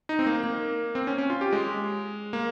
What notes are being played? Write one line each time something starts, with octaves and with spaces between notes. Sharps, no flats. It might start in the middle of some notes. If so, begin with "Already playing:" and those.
D#4
C4
A#3
A#3
C4
C#4
C#4
F4
G4
G#3
A#3